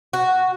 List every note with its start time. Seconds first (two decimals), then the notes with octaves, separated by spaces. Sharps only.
0.13 F#4